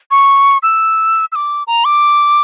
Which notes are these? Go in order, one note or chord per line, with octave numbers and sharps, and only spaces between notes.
C#6
E6
E6
D6
A#5
D6